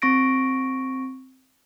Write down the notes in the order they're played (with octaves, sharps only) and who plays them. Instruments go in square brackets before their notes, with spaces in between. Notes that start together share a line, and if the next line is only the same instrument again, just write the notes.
[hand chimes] C4 C#6 A#6 D7